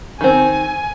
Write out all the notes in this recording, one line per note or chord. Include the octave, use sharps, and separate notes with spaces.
D#3 C4 G#5